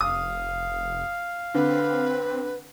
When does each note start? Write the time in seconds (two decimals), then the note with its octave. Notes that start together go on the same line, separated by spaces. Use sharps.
0.01 F1 F5 D#6
1.54 D3 C4 B4